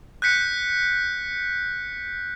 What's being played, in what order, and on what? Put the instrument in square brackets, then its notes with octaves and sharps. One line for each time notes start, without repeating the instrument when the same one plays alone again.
[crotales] F#6 G6 B6 C#7